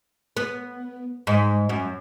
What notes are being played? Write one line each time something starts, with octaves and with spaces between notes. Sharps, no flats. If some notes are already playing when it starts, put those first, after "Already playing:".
B3
G#2
F#2